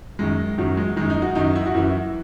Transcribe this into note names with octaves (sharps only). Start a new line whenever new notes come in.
F#2 D#3 G#3
F#2 D#3 F#3
G#3
F#2 D#3 G#3
D#4
F#4
F#2 D#3 D#4
E4
F#4
F#2 E3 E4